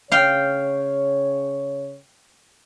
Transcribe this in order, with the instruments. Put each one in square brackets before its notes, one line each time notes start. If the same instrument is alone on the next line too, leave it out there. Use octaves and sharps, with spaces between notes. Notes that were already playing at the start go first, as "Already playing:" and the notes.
[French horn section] C#3 C#5 [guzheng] F5 G5